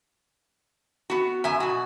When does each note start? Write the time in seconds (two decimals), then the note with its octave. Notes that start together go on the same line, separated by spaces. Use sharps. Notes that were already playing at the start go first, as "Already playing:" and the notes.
1.10 B3 F#4
1.44 F#2 E5 G#5
1.60 B2 F#4